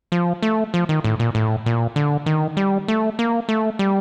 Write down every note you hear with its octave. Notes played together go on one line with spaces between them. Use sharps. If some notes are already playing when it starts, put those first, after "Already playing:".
F3
A3
F3
D#3
A2
A#2
A2
A#2
D3
D#3
G3
A3
A#3
A3
G3